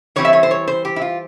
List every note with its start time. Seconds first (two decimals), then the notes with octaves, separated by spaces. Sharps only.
0.16 E3 G3 C4 E4 C#5
0.25 E5
0.33 C#5
0.43 C5
0.51 C#5
0.68 C5
0.85 G4
0.96 E4
1.02 F4